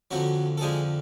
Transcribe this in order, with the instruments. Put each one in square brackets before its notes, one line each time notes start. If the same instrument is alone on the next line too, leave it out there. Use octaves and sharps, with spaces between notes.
[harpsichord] F2 D3 F3 F#3 F#4
A4
F2 D3 F3 G#3 G#4